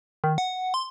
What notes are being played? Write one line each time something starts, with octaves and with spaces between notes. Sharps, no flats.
D#3
F#5
C6